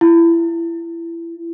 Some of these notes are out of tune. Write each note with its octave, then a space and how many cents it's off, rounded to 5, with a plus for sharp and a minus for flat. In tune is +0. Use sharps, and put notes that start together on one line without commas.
E4 +25